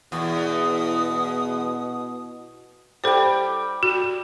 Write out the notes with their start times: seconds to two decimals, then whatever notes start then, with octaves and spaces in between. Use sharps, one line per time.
0.12 E2 B2 D#6
3.04 G3 A4 C5 G5
3.83 F#4